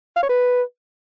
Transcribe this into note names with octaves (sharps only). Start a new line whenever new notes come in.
F5
C#5
B4